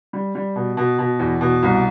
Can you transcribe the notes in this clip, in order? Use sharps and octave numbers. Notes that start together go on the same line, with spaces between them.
G3
G3
B2
B2
B2
E2
B2
C2